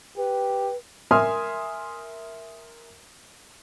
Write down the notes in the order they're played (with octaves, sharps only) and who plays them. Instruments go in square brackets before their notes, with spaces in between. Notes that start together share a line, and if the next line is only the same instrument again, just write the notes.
[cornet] G4 [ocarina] B4
[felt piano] A#4 E5 G#5 C6 D#6 F6